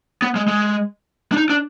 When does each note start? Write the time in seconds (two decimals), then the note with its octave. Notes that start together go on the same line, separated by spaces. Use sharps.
0.22 B3
0.36 G#3
0.48 G#3
1.32 D4
1.37 D#4
1.50 D4